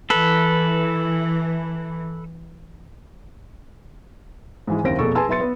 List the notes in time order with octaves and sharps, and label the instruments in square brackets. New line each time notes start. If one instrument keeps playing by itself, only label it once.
[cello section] E3 [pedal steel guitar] A4 B4
[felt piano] G#2 E3 G#3
F#1 D#2 C4 A#6 D7
F1 B2 A#3 G#4 A4 C#6
G#4 B4 G#5 A5 C6 E6
B1 B4 E5 C6 A6 C#7
B3 B4